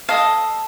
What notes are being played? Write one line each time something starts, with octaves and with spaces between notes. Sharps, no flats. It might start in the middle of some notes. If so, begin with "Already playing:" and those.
A4 D#5 F5